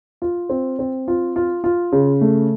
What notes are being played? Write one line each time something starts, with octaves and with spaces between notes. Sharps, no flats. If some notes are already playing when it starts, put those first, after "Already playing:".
F4
C4
C4
F4
F4
F4
C#3
A3